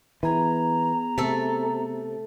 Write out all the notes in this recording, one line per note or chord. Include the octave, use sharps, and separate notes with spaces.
E3 B3 G#4 A#5
C3 A3 A4